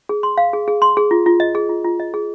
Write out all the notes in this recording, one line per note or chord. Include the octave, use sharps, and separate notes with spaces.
G#4
C6
F5
G#4
G#4
C6
G#4
F4
F4
D#5
G#4
F4
F4
D#5
G#4